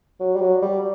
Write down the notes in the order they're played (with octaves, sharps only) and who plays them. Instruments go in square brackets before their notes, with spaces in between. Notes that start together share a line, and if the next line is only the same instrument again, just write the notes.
[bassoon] F#3
G3
F#3
G3